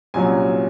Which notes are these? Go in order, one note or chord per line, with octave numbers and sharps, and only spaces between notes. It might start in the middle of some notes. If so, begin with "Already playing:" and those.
C2 A#2 F#3 C#4 G#5